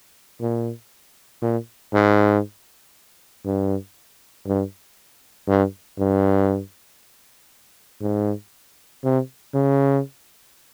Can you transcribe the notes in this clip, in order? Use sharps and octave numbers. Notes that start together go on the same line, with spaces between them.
A#2
A#2
G#2
G2
G2
G2
G2
G#2
C3
C#3